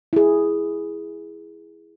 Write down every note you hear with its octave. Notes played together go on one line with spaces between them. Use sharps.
E4 G#4